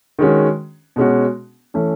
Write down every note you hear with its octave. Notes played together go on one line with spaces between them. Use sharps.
D#3 G#3 C#4 F#4
B2 G#3 C#4 F#4
E3 A3 C#4